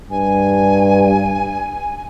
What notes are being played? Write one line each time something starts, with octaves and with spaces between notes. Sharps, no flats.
G2 G#5